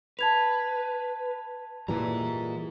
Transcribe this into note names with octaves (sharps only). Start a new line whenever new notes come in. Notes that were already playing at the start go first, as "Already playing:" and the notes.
B4 A5 G#6 F7
A#2 E3 G3 G#4 A#5